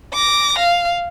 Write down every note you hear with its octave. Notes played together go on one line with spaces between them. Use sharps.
D6 A#6
F5